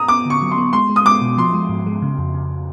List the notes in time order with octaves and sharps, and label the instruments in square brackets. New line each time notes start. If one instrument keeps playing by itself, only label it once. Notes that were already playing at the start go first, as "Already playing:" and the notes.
Already playing: [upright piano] A#5 D#6
[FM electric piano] B3 [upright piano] D6
[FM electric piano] D3 [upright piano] C#6
[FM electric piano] F#3
[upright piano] C6
[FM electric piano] B3
[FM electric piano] G#3 [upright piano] C6
[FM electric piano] G#3
[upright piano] D#6
[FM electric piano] G#3 [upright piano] D6
[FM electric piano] B2
[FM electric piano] F3 [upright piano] C6
[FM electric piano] G#3
G#2
G#3
C#3
F2
C#3